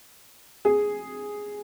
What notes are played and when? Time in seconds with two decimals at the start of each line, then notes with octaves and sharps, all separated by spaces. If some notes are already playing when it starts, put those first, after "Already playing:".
0.65 G#4